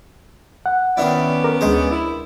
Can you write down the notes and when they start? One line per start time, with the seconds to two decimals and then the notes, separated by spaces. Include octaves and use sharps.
0.66 F#5
0.97 D#3 B3 C#4 D4 E4 D5
1.44 A#4 D6
1.61 D2 G#3 G#4 C5 D#5
1.91 E4